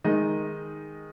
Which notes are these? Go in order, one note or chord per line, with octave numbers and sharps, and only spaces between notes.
D#3 G#3 D#4 D#5